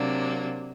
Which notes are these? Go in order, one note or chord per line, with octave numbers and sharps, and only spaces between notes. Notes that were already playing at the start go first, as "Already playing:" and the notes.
Already playing: C3 F#3 A#3 D4